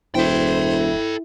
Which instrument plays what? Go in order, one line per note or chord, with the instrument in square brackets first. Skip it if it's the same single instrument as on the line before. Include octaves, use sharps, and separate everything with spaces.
[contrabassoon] E1 [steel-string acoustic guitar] E4 [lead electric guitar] A4 G5 [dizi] C5